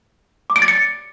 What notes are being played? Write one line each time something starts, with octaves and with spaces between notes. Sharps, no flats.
D6
D7
A6
C#7